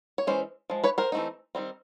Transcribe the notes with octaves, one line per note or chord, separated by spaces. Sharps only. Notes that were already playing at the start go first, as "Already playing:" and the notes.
C#5
E3 G#3 C#4 C5
F3 G#3
B4 C#5
A#4 C5
E3 A3 C4 D#4
D#3 G3 C4